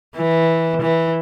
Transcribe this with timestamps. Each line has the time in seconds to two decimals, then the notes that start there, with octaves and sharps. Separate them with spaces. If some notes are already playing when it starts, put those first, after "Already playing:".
0.17 E3
0.82 E3